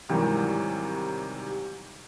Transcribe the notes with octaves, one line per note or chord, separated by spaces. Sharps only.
G#2 C3 D#3 E3 F#3 G3